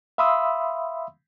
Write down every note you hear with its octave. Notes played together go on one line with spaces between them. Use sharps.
E5 F5 B5 C6 D#6 E6